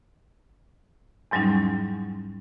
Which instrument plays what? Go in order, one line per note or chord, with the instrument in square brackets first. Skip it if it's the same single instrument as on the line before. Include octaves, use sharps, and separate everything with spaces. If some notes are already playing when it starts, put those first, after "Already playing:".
[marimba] E2 G#2 F#3 G3 C#4 D#4